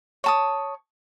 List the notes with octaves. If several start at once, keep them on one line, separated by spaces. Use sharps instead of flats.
C#5 A5 D#6